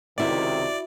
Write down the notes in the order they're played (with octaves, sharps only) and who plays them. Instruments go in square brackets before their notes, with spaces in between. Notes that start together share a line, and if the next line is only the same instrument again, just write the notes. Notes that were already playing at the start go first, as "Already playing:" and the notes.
[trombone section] C#2 C3 D#3 [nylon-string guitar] E4 F#4 [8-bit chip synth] D5